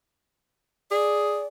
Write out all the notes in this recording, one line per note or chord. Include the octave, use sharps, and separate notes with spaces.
G#4 D5